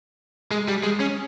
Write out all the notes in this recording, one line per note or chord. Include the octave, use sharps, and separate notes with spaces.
G#3
G3
G#3
C#4